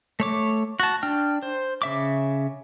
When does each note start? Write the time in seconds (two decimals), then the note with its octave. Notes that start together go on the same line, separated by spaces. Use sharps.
0.20 A3 C#5 D6
0.80 F#4 A5
1.03 D4 G5 F6
1.42 C5
1.82 C#3 E5 D6